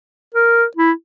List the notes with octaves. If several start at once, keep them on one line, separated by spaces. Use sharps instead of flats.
A#4
E4